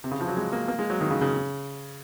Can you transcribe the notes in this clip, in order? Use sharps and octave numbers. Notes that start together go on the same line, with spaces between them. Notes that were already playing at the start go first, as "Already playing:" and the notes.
C3
C#3
F3
F#3
G#3
A#3
A#3
G#3
F#3
D#3
C#3
C#3